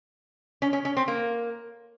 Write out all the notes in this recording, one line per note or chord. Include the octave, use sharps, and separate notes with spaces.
C#4
C#4
C#4
C4
A#3